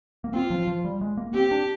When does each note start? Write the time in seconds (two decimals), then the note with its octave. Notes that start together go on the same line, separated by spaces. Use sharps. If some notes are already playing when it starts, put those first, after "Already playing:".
0.24 A#3
0.34 C4 F4
0.50 F3
0.67 F3
0.84 G3
1.01 G#3
1.17 A#3
1.34 C4 G4
1.51 D4